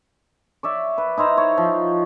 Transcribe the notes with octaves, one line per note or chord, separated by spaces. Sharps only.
C#5 D5 E5
B4
D#4 E4 C5 A#5
C#5
F3